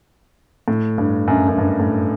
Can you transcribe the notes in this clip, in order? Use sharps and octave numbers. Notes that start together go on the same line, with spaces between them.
A2
G2
F#2
F#2
G2
A2